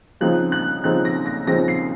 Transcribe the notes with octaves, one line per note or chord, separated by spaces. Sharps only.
C#3 F3 C4 D#4 F#6
F#6
C#3 F3 C4 D#4 F#6
A#6
A#6
C#3 F3 C4 D#4 A#6
C7